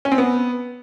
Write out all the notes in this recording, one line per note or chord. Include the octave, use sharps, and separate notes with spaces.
C#4
C4
B3